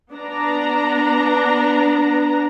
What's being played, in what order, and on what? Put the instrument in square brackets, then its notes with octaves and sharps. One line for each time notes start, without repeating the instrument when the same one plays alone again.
[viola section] B3 D4 A#5